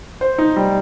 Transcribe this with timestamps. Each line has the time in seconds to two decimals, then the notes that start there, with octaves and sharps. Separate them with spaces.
0.21 C5
0.38 D#4
0.56 G3